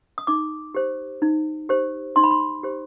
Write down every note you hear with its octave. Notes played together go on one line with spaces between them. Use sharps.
D#6
D#4 D6
G4 C5
D#4
G4 C5
D#4 C6
B5
C6
G4 C5